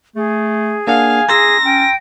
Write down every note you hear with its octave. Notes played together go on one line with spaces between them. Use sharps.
A3 G#4
A#3 D4 F5 F#5 G#5
G#4 A#5 C6 E6 A#6
C#4 G5